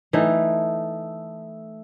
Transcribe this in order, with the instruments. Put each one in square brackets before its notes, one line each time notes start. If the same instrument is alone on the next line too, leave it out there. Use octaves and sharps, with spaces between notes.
[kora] E3 D#4 [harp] A3